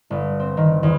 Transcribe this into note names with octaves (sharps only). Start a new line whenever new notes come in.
G1
C4
D#3
E2